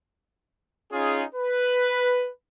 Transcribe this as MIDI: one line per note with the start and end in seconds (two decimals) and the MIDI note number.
0.92 1.24 61
0.92 1.24 63
0.92 1.24 65
0.92 1.24 68
1.35 2.30 71